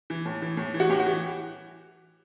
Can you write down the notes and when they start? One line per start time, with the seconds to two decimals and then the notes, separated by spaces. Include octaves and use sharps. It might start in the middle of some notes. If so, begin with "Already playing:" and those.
0.10 E3
0.26 A2
0.42 E3
0.57 A2
0.74 E3
0.80 F#4
0.90 A2 G4
1.00 F#4
1.06 E3